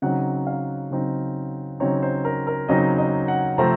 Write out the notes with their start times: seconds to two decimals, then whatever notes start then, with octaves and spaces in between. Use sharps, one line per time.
0.02 C#3 F#3 C4 D#4 F#5
0.47 F5
0.91 C#3 F#3 C4 D#4
1.80 C#3 F#3 C4 D#4 C#5
2.03 C5
2.25 A#4
2.47 A#4
2.68 C#3 F#3 C4 D#4 D#5
2.98 D#5
3.28 F#5
3.58 C3 F3 A3 C4 A#5